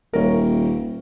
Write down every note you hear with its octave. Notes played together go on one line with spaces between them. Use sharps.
D#1 A#4 C#5